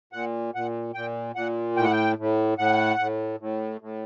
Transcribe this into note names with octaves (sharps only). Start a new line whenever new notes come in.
A#2 F#5
A#2 F#5
A#2 G5
A#2 F#5
A2 G5
F#5
G5
A2
A2 F#5
A2
A2
A2